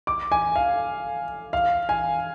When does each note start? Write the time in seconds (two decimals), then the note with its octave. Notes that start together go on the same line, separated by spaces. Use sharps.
0.07 D6
0.32 G#5
0.56 F5
1.53 F5
1.89 G#5